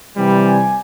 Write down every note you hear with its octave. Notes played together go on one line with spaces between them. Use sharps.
C3 E3 G3
G#5